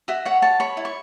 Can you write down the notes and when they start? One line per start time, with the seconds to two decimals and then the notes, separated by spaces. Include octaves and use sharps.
0.08 F#4 E5
0.25 C#5 F#5
0.42 C#5 A5
0.60 C#5 B5
0.77 E4
0.85 C#6